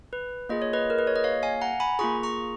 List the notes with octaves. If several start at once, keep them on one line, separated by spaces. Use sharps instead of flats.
B4
A#3 F4 G#4 D#5
C#5
B4 D#5
A#4
B4
C#5
D#5
C#5 F5
F5 G#5
F#5 A#5
G#5 B5
A#3 F4 G#4 A#5 C#6
A#5 C#6